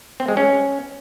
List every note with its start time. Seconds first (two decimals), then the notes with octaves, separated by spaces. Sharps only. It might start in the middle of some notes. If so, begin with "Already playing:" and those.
0.20 C4
0.28 G#3
0.37 C#4